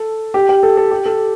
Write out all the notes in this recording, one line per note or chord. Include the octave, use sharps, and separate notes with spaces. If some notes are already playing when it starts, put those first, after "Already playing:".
Already playing: A4
G4
G4
A4
A4
G4
A4